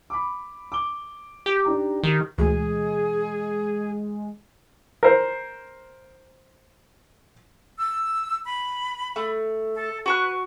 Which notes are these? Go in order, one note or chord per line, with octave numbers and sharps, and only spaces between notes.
B5 D6
D6 G7
G4
D4 D#4 A#5
D#3 G4
D2 B2 E3 G#3 G#4
A#4 C5
E6
B5
A3
A4
F#4 B4 C#6 F#6